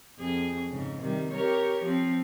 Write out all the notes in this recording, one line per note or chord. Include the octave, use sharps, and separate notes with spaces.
F2 G#4
G#2 C#3
C3 D#3 G3
G4 A#4 C#5
F3 C4